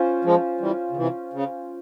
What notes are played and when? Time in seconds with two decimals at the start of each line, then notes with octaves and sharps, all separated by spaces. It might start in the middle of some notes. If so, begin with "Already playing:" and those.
Already playing: C#4 F4 C5
0.24 F3 G#3
0.60 E3 G3
0.91 C#3
0.97 C3 E3
1.33 C#3